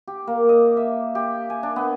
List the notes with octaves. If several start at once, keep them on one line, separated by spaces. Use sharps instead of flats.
G4
A#3
D#5
E5
G4
G#5
D4
B3